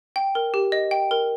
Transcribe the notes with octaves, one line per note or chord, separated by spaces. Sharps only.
G5
A#4
G4
D#5
G5
A#4